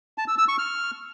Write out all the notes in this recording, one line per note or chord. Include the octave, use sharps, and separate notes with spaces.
A5
E6
E6
C#6
F6